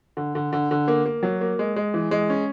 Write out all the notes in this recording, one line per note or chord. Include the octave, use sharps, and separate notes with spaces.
D3
D3
D3
D3
A#3
A#3
F#3
A#3
G#3
G#3
E3
G#3
C#4